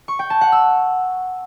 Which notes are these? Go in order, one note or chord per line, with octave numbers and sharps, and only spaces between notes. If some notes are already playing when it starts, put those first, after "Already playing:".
C#6
G5
A5
F#5
E6